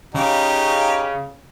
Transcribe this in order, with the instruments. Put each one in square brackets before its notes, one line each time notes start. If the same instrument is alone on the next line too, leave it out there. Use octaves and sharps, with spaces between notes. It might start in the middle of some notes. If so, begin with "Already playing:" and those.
[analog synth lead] C#3 [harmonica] D#4 G4